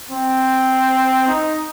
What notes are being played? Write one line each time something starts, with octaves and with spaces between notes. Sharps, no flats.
C4
D#4